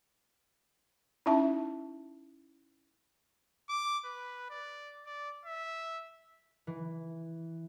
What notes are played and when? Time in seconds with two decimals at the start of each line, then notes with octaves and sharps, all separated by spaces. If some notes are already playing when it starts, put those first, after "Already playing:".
1.26 C#4 D#4 E4 E5 A5
3.69 D6
4.05 B4
4.50 D5
5.06 D5
5.46 E5
6.67 E3